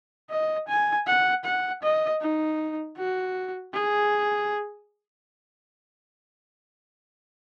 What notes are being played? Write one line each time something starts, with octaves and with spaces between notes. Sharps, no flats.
D#5
G#5
F#5
F#5
D#5
D#4
F#4
G#4